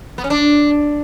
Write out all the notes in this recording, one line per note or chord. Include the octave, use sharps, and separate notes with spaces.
B3
C#4
D4